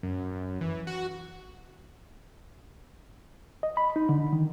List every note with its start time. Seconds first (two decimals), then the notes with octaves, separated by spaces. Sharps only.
0.03 F#2
0.61 E3
0.87 F#4
3.63 D#5
3.77 B5
3.96 D#4
4.09 D3
4.33 D#3